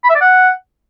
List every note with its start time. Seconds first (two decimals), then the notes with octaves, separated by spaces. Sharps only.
0.04 B5
0.10 E5
0.15 D5
0.21 F#5